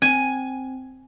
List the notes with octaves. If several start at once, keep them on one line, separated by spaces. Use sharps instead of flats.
C4 G#5